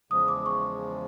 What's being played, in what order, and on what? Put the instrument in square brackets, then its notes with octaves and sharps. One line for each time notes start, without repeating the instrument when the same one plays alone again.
[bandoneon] E2 C#3 F3 G#3 [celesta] D#6
[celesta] D6
C#6